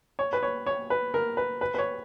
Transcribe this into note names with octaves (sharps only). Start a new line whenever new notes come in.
C#5
B4
C#5
C#5
B4
A#4
B4
B4
B4
C#5